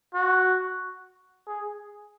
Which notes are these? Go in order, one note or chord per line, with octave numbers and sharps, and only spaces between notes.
F#4
G#4